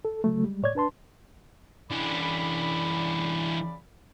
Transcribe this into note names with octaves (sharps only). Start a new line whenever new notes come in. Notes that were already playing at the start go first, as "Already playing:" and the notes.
A4
C#3 F#3 A3
G3 G#3
A2 C#5 D5 G#6
D4 B4 A5 C6
C#3 E3 D4 D5 B5